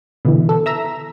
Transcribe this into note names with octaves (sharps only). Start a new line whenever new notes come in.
B2 D3 E3
A4
E5 A#5 E6